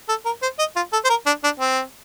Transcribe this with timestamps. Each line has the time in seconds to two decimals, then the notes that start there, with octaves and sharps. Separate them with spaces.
0.09 A4
0.25 A#4
0.42 C5
0.59 D#5
0.76 F4
0.93 A4
1.05 C5
1.10 A#4
1.26 D4
1.44 D4
1.60 C4